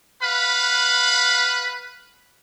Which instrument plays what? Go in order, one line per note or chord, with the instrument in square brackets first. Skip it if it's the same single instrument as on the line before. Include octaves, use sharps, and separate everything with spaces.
[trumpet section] B4 F5 F#5 B5